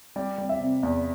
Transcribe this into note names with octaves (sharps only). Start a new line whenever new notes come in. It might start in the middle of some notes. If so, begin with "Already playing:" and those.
G3 D5
G3
E5
C3
E2